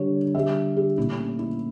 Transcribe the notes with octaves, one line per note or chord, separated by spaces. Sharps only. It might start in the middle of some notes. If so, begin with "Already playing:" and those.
Already playing: D3 G3 C#5
D3 G3 E5
G4
A#2 A3 E4
C#4
E4